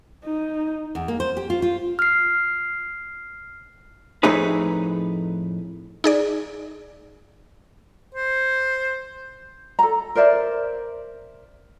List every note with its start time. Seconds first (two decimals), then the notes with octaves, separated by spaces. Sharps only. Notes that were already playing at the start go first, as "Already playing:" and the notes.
0.25 D#4
0.95 E2
1.08 A#3
1.20 C5
1.37 G4
1.50 F4
1.62 F4
1.99 F6 C7
4.23 F2 A2 A3 D#4 G#4 B4
6.04 D#4 G#4 D5
8.15 C5
9.79 A4 A#5
10.15 A#4 C5 D5 E5